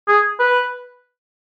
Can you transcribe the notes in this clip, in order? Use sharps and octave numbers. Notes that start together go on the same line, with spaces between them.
G#4
B4